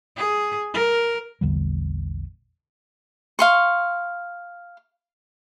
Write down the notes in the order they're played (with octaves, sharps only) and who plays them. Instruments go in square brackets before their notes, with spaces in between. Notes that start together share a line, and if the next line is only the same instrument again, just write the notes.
[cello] G#4
A#4
[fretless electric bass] A#1 E2 D3 G3
[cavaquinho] F5 C6 C#6